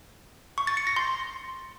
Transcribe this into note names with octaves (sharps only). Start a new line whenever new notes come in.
C#6
A6
C#7
A#6
C6